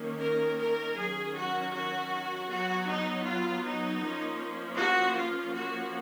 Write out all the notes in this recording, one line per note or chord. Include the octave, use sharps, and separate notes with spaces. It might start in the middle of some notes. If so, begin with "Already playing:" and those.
Already playing: D#3 A#3 C#4
A#4
A#4
D#3 F#3 C#4 G#4
F#4
F#4
F#3 B3 F#4
D#4
F4
D#4
F3 A#3 C#4
F#4
F4
F3 A#3 C#4 F#4